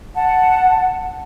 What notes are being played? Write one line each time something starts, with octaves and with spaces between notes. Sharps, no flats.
F#5 A5